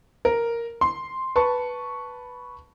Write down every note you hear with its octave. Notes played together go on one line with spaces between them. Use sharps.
A#4
C6
B4 A5 C#6